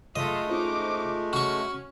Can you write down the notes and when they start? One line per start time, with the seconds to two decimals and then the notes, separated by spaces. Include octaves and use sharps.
0.16 F#2 G#3 A3 F4 A4 D#5 B6
0.50 C#4 D#4 F4 C5 D6
1.33 C#4 F#4 C#6 F6